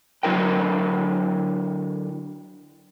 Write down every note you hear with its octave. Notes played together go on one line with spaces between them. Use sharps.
D3 F#3 E4 A#4 G5